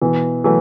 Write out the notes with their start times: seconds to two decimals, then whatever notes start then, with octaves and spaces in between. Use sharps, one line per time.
0.02 B2 E3
0.44 E3 F#3 A3